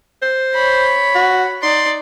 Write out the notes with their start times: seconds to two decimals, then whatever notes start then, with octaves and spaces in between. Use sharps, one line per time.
0.22 C5
0.55 C#5 B5
1.15 F#4
1.63 D#4 D5 C6